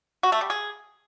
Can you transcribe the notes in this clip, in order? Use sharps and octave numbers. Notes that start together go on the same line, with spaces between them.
F#4
A3
G3
G#4